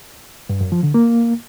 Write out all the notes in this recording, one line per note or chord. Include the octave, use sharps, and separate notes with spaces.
G2
F#2
F3
D3
A#3